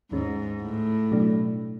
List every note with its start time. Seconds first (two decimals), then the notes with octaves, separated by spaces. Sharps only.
0.11 D#2 G#2 D#3 G#3 C#4
0.62 A2
1.12 B2 F#3 A3 D4